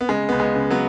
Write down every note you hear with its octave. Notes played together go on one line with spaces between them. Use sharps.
B3
C#3 G#3
C#2 B3
G#3
C#3
F#3 B3